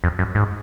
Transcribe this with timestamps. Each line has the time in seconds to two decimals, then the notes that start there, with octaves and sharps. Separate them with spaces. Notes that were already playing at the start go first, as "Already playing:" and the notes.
0.04 F2
0.19 F#2
0.35 G#2